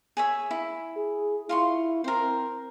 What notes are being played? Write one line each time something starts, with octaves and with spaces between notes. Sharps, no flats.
G#4 C#5 E5
E4
G#4
E4 F4 C6 C#6
C4 A#4 C5